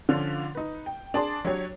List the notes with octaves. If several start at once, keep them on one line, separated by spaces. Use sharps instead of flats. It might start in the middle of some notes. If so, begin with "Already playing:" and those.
D3 F3 C#4 D4 F4
D#4 B4
G5
D4 G#4 D5 A5 C6
F#3 D4 G4 C#5